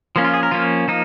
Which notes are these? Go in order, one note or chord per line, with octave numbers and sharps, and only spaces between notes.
F3 A#3 C#4
F4
G#4
A#4
F3 A#3 C#4 F4
F3 A#3 D#4